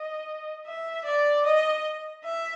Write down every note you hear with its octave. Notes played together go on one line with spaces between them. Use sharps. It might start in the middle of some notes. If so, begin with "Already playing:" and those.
Already playing: D#5
E5
D5
D#5
E5